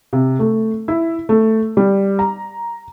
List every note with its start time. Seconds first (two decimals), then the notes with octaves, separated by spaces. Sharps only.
0.13 C3
0.39 A3
0.88 E4
1.29 A3
1.77 G3
2.19 A#5